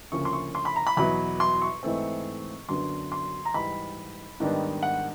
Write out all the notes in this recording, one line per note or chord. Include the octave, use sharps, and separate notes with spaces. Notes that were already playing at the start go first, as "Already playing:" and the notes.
D2 C#3 F3 A#3 C#4 C#6
C6
C#6
C6
B5
A#5
B5
E2 B2 F#3 B3 E4 B5
C6
C#6
G#2 E3 A3 C4
F#2 D3 F#3 B3 D4 C6
C6
A#5
G#2 E3 G3 B5
G#2 D#3 G3 B3 D4
F#5